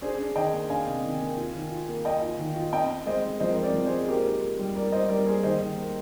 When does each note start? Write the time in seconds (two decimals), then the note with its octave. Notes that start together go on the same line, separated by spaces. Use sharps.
0.02 D4 G#4 C5
0.18 D4
0.36 D#3 D#5 G5
0.53 A#3
0.70 D4 F5 G#5
0.87 C3
1.04 D#3
1.21 A#3
1.37 F4
1.54 D#3
1.71 F4
1.88 A#3
2.05 A#3 D#5 G5
2.22 F4
2.39 D#3
2.56 F4
2.73 C4 D#5 G5
2.90 C4
3.06 G#3 C5 D#5
3.23 G#3
3.40 F3 C5 D#5
3.49 A#4
3.56 C4 C5
3.63 A#4 D5
3.74 F3
3.85 G#4 C5
3.91 G#3
4.08 A#3 G4 A#4
4.25 D#4
4.42 A#3
4.59 G3
4.76 D#4 A#4 D5
4.92 D#4 C5 D#5
5.09 G3 A#4 D5
5.26 A#3 G#4 C5
5.43 D#3 C5 D#5
5.61 D#3
5.77 A#3